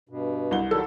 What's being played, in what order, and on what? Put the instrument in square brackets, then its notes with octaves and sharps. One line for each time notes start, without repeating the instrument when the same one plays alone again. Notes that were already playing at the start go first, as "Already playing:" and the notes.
[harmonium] G2 B2
[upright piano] C2 G7
[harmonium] D#3 F#3 G3 [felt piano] A4